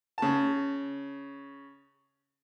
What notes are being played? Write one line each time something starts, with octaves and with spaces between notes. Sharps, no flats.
C#3 A5